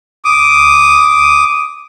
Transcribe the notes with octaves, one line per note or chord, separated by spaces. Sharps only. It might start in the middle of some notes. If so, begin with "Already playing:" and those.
D6 D#6